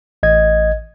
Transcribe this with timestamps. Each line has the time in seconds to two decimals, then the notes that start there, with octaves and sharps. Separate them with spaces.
0.23 A1 D#5 G#6